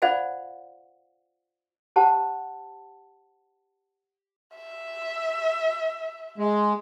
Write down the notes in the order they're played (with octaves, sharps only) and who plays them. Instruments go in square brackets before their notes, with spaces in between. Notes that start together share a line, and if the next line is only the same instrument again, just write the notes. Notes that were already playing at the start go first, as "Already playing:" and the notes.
[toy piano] F4 C5 D5 F5 F#5 G#5
G4 C5 F#5 A5
[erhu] E5
[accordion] G#3